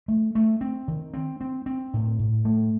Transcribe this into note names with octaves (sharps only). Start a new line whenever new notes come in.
A3
A3
C4
D#3
C4
C4
C4
A2
A2
A3